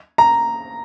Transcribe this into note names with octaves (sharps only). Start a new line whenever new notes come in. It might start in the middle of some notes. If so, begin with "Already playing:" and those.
A#5